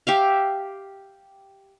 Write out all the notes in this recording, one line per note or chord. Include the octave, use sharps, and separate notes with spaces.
G4 E5 F5